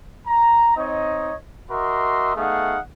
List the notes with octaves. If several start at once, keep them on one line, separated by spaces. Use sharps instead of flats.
A#5
C4 D#4 C#5 D#5
F#4 A#4 D#5 E5 C6
A3 B3 D#4 G#4 F5 F#5